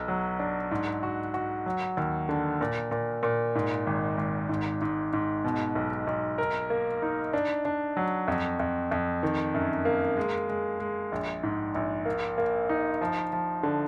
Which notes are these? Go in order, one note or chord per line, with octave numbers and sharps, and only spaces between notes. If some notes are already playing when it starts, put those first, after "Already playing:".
Already playing: B1
F#3
D4
G#2
F#4
F#4
F#3
D#2
D3
A#2
A#2
A#2
G#2
G#1
G#1
G#2
G#2
G#2
B2
B1
B1
A#4
A#3
D#4
D4
D4
F#3
F2
F2
F2
D#3
F#2
A#3
G#3
G#3
G#3
A#1
G#2
A#1
A#3
A#3
D#4
F3
F3
D3